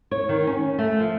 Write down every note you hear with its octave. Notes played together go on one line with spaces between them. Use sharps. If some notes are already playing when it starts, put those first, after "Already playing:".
C#5
D#3
C#4
A3
F3